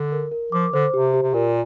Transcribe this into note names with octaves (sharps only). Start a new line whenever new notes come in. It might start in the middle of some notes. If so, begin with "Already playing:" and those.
Already playing: D3
A#4
A#4
F3 D6
D3 C5
C3 G4
G4
C3
A#2 A#4